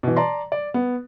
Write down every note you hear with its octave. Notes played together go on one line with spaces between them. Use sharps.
B2 E3
D5 A5 A#5 C6
D5
B3